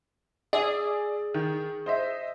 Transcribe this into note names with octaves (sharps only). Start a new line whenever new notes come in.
G#4 D5 G#5 E6
D#3
C5 D#5 E5